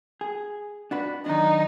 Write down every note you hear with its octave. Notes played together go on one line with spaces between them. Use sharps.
G#4
D4 F#4 B4
D#3 F#3 D4 D#4